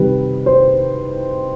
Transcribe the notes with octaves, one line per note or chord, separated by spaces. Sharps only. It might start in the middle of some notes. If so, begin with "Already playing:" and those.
Already playing: C3 D#3 G3 B4
C5